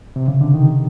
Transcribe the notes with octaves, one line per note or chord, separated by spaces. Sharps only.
C3
C#3
D3
D#3